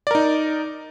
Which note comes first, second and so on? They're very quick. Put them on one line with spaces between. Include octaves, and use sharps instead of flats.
D5 A#4 D#4